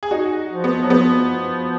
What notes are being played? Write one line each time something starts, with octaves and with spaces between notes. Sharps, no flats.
G#4
D#4 F#4
F3
B3
F#3
F3 B3